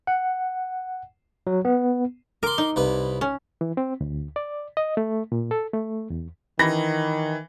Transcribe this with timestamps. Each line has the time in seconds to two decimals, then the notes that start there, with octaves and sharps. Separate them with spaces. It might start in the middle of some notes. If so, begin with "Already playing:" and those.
0.07 F#5
1.47 F#3
1.65 B3
2.43 A#4 C6 D6
2.58 D#4
2.76 C2 B4
3.21 C#4
3.61 E3
3.77 C4
4.01 D2
4.36 D5
4.77 D#5
4.97 A3
5.32 A#2
5.51 A4
5.74 A3
6.10 E2
6.59 D#3 E3 B5 A#6